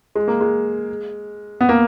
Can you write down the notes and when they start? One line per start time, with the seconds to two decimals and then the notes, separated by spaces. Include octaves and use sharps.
0.15 G#3
0.28 A#3
0.41 G#3
1.61 B3
1.69 A#3